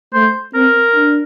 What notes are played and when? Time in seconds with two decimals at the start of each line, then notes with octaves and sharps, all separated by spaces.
0.13 A3 C5
0.54 C4 A#4
0.95 D4